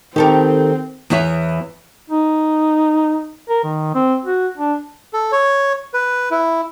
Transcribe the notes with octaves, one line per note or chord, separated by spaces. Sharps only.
D#3 C4 G4 A4 A#4
E2 E3 B3 C#5 E5
D#4
A#4
D#3
C4
F#4
D4
A4
C#5
B4
E4